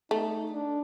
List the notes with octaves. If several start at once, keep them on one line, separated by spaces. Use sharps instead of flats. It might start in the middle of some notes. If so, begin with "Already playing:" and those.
A3 D#4
D4